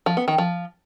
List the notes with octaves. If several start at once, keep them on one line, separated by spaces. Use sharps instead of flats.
F3
B3
D#3
F3